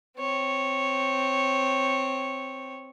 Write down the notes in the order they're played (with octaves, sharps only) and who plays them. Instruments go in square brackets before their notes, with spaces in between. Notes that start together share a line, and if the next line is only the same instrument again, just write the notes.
[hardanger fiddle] C4 C#5